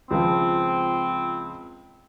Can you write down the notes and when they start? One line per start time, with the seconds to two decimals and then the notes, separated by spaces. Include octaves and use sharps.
0.11 C#2 F3 C4